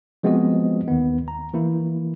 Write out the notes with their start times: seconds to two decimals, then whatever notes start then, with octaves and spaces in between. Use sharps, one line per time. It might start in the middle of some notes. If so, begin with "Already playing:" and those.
0.23 F3 G#3 B3 C4 F#4 D#5
0.88 D#2 D#3 B3
1.28 A#5
1.54 E3 A#3 E4